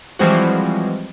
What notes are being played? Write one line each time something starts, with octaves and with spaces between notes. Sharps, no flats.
E3 F3 G3 G#3 C4 F#4